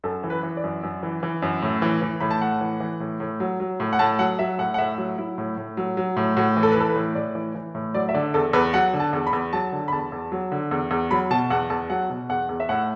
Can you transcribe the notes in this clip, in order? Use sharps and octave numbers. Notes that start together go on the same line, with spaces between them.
F#2 A4
E3
B4
E3
D5
F#2
F#2
E3
E3
F#2
A2
E3
E3
A2 B5
A5
A2 F#5
E3
E3
A2
A2
F#3
F#3
A2
F#5
A2 A5
F#3 F#5
F#3 E5
A2 F#5
F#5
A2 E5
F#3
F#3 E4
A2
A2
F#3
F#3
A2
A2 F#4
E3
A4
B4
E3 A4
B4
A2
A2 D5
E3
E3
A2
F#3 D5
E5
D3 D5
E2 A4
E2 B4
F#3 F#5
D3
A5
E2
B5
E2
F#3 A5
D3
B5
E2 A5
E2
F#3
D3
E2
E2
F#3 B5
B2 A5
E2 F#5
E2 A5
F#3 F#5
B2
E2 F#5
E2
E5
A2 F#5